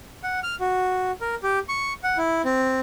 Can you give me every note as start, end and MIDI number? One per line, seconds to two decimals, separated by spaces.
0.23 0.40 78
0.43 0.55 89
0.60 1.12 66
1.21 1.35 70
1.43 1.59 67
1.69 1.93 85
2.03 2.18 78
2.18 2.42 64
2.45 2.80 60